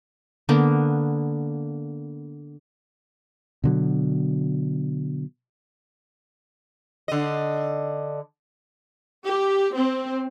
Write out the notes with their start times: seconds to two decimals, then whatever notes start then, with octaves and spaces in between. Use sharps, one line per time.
0.49 D3 A#3 B3
3.64 B2 D3 F#3
7.08 D3 D#5
9.27 G4
9.76 C4